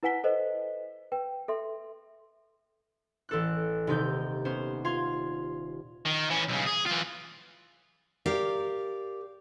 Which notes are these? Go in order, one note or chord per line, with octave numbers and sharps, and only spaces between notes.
E4 B4 F#5 G#5 B6 G7
A4 B4 C5 D#5
B4 G5
A4 E5 C6
A1 A4 F#6
D#1 C3 D#4 G6
B3 C#4 C5
F4 F5 C6 G#6
D#3
E3 C#4
B1 C#3
G#4
E3 F4
G4 A#4 D5 F5